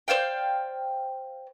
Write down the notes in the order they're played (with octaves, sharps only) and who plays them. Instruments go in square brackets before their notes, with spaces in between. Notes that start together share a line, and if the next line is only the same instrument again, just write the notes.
[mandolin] C5 D5 F5 G5